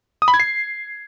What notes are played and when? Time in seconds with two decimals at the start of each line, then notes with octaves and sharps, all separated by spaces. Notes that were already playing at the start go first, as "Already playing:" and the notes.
0.22 D#6
0.28 B5
0.34 G#6
0.40 C7